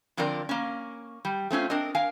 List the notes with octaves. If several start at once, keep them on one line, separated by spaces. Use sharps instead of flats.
D3 F3 C4 A#4 D5
A#3 C#4
G3
A3 C4 C#4 F4
C4 D4 A#4 D#5
A#4 F5 G#5